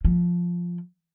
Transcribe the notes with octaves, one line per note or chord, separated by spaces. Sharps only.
F3